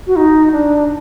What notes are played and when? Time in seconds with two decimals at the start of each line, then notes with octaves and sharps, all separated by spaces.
0.07 F#4
0.16 D#4
0.52 D4